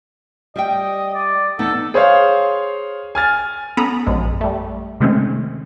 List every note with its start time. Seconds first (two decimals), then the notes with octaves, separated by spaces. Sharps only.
0.56 G3 D#5 E5 G5
1.15 D5
1.59 E2 B3 D#4 A4
1.94 G#4 C5 C#5 F5
3.15 G#5 F6 A6
3.77 B3 C#4 A4 A#5 B5 D#6
4.07 A#1 F#2 G#3
4.41 G3 A3
5.00 C3 D#3 G#3 A3 C4 C#4